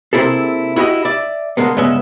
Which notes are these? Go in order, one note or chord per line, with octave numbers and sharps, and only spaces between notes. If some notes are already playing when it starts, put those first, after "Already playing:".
C3 A#3 C4 E4 G#4 A4
E4 F#4 G4 D#5
D5 E5
D3 E3 G#3 A#3 B3
G2 C#3 G#3 B3 E5